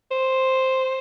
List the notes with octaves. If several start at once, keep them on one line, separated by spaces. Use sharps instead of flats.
C5